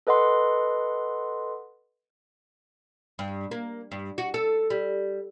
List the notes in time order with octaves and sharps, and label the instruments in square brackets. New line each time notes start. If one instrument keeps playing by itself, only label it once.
[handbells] A4 B4 D#5 F#5 C6
[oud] G2
A#3
G2
F#4
A4
G3